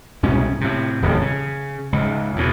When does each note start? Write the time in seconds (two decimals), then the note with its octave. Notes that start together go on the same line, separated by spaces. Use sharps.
0.23 C2 G#2 B2 C#4
0.61 A2 C3
1.02 D#1 A1 F2
1.21 C#3
1.92 C#2 G#2
2.36 E2 B2